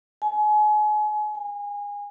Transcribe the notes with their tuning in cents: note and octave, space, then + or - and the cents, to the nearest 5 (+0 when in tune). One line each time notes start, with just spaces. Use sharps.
G#5 +35
G#5 -25